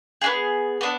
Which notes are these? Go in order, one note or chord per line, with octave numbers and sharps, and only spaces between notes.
B3 D4 G#4
B3 D4